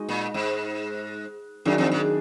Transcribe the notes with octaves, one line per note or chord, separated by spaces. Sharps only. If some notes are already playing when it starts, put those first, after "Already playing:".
Already playing: G#3 D#4 F#4 D#5
A#2
G#2
F#2 D#3 F#3 D4 G#4
F2
G#2